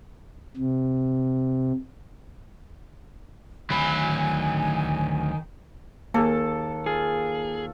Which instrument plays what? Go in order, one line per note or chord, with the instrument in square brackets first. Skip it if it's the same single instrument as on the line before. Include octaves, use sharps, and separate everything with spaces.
[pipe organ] C3
[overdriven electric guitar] D2 F#3 [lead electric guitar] D#3 B5 [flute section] G#5
[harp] D#2 G#4 [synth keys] A#3 [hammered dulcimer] A4
[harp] F4 [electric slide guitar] G#4